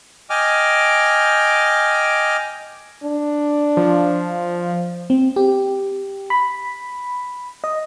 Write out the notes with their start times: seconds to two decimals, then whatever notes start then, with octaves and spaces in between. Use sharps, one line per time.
0.30 D#5 G5 G#5 D6 F6
3.04 D4
3.77 F3
5.10 C4
5.36 G4
6.30 B5
7.64 D#5